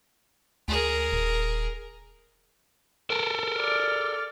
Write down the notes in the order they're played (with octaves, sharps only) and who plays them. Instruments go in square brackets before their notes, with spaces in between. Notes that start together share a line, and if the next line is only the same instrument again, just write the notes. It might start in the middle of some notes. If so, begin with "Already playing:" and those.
[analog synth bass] D2 [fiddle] G#4 A#4
[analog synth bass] D#1
[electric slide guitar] A4 A#4
[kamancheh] D5 F6